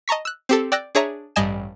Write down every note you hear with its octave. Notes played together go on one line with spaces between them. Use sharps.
D#5 A5 A#5 C#6 B6
E6 F#6
C4 G4 A4
D5 G5 E6 F#6 A#6
D4 G#4 C#5 E5 A#5
A1 G2 G3 D#5 G#5 E7